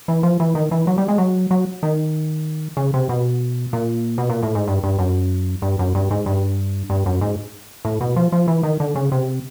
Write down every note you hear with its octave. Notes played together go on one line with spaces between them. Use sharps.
E3
F3
E3
D#3
E3
F#3
G3
G#3
F#3
F#3
D#3
C#3
C3
B2
A#2
B2
A#2
A2
G#2
G2
G2
F#2
G2
F#2
G2
G#2
G2
G2
F#2
G#2
A2
B2
F3
F3
E3
D#3
D3
C#3
C3